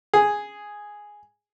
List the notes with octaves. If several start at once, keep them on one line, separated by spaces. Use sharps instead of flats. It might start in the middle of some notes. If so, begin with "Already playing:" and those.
G#4